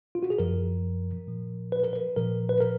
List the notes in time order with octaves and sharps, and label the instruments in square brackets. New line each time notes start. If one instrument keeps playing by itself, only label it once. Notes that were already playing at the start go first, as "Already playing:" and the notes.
[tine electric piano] F4
F#4
G#4
F#2 F3 A#4
A#2 F3
B4
A#4
B4
A#2 F3 A#4
B4
A#4